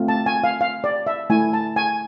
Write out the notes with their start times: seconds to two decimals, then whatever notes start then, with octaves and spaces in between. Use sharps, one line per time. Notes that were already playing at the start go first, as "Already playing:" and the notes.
Already playing: A3 C4 F4
0.08 A5
0.26 G#5
0.44 F5
0.61 F5
0.84 D5
1.07 E5
1.30 A3 E4 G#5
1.53 A5
1.76 G#5